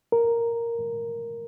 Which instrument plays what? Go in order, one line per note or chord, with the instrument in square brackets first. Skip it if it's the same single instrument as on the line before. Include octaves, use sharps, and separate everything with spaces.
[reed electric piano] A#4